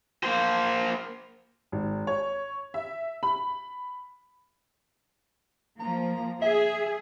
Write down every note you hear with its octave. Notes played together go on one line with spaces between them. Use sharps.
A#3 C5
G#1
C#5
E5
B5
F3 A#3 A#5
G#4 E5